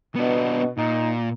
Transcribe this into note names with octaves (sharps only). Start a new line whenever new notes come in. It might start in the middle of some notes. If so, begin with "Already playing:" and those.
B2 B3 D4
A#2 D#4